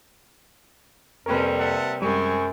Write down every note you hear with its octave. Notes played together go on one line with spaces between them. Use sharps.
F2 C3 G3 A#3 C#4 A#4 B4
E5 F#5 A5
F#2 G3 G#3 C4 G#5 C#6